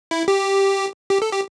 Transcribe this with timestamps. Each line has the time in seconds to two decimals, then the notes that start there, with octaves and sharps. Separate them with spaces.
0.11 E4
0.28 G4
1.10 G4
1.22 A4
1.32 G4